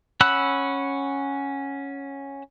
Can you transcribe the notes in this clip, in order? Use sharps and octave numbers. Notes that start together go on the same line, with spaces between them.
C#4 F#5 B5 E6 F#6